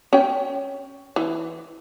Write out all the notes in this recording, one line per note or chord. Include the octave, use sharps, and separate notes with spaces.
C#4 G5
E3